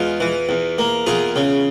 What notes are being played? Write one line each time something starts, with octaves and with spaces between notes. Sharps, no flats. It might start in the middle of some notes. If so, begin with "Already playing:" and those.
Already playing: E2 G#3 F4
E3
E2
A#3
E2 F4 G#4
C#3